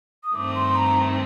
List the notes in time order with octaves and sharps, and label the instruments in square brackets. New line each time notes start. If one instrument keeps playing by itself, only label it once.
[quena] D#6
[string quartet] G2 D#3 A3 C4 [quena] D6
[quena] C6
A#5